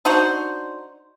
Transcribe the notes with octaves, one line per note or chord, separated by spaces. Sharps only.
D4 D#4 F#4 C5